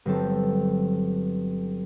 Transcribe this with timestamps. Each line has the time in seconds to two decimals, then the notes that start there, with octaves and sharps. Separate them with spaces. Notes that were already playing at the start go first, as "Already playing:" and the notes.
0.06 G1 F#3 C4 A4